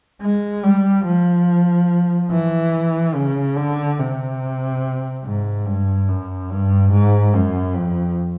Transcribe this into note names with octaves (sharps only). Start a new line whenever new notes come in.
G#3
G3
F3
E3
C#3
D3
C3
G#2
G2
F#2
G2
G#2
F#2
F2